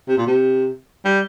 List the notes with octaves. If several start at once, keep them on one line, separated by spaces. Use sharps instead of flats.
C3
A#2
C3
G3